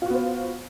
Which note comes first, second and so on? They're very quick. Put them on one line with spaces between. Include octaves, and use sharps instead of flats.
F4 F#4 B3 C5